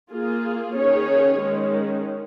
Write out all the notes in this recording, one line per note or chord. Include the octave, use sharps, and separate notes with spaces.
A#3 F4 G#4
D#3 C#4 G#4 C#5
D#3 G#3 C#4